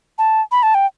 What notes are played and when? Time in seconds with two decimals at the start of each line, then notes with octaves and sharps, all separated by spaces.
0.18 A5
0.52 B5
0.63 A5
0.75 G5